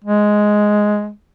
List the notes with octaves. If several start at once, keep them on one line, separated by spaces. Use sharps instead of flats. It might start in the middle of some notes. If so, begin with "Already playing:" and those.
G#3